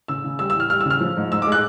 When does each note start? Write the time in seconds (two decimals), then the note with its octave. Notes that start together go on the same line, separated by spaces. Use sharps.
0.08 C#3 E6
0.24 C#3
0.39 G3 E6
0.50 E6
0.55 E3 F6
0.70 G3 F6
0.81 E6
0.86 C#3 F6
1.01 F3
1.17 G#2
1.32 G#2 E6
1.42 D6
1.47 G#3 F#6